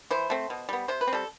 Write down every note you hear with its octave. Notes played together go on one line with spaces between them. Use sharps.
E3 C5
A3 C4
B2
G3 B3
C3 C5
B4
C4
G3 A4